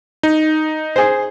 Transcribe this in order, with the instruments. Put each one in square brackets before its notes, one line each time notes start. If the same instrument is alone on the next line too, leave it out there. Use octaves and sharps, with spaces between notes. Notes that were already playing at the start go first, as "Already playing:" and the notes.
[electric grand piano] D#4
[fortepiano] G#4 C5